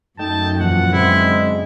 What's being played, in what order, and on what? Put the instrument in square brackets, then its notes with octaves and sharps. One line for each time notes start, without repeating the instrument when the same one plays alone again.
[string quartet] F#2 [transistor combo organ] A3 D#4 G5 [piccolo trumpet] A5
[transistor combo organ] E2 A#2 F3 [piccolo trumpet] F#5
[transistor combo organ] D3 B3 [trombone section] G#3 C4 [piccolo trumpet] E4
[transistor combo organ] D3